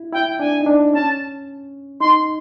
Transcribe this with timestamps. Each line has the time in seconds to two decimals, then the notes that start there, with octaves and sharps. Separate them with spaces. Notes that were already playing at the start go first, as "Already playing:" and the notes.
Already playing: E4
0.13 E4 G5
0.40 D4 G#5
0.61 D#4
0.66 D4
0.93 C#4 A5
2.00 D#4 C6